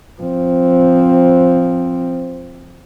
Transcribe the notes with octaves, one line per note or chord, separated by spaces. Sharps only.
F3 C4